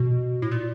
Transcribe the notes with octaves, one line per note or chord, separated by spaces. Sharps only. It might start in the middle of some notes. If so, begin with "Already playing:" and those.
Already playing: B2
A2
A#2